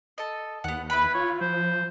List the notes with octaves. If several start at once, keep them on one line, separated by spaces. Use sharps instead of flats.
A4 D#5
D#2 B3 F#5
E4 B4 B5
F4 C#5
F3 C5